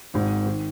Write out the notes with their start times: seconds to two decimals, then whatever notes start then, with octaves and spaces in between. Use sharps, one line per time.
0.14 G#1 G#2 D#3
0.46 D#3